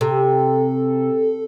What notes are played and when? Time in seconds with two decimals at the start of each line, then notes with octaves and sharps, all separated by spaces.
0.01 C3 A4